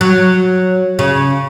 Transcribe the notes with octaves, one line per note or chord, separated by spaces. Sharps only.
F#3
C#3